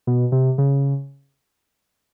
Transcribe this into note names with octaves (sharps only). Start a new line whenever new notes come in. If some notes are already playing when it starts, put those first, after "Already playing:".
B2
C3
C#3